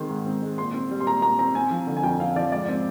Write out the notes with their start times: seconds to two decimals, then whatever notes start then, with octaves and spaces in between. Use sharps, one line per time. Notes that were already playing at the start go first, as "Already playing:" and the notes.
Already playing: D#3 G#3 C4 C6
0.10 G#2
0.26 C4
0.42 G#3
0.58 A#2 C6
0.74 C4
0.91 G3
1.00 C6
1.07 A#2 A#5
1.22 A#2 A#5
1.39 C4 A#5
1.55 C4 G#5
1.71 F3
1.87 D3
1.97 G#5
2.03 F2 G5
2.20 C4 F5
2.36 F3 D5
2.52 G#2 D5
2.69 C4